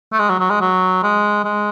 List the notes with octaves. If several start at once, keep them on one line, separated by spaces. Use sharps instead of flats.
A3
G#3
F#3
F#3
G#3
F#3
G#3
G#3